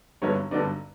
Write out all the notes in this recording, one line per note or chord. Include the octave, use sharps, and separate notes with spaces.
G2 D3 F#3 B3 D#4 C#5
G2 D3 F#3 B3 D#4 D5